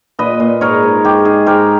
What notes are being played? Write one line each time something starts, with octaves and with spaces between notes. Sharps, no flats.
A#2 B4 D#5
A#2
G#2 A#4 C#5
G#2
G#2 G4
D#4 G#4
G#2 G4 A#4